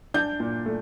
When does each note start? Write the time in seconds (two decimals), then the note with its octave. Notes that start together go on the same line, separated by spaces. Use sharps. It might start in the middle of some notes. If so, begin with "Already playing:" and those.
0.14 D4 G6
0.40 A#2
0.66 A3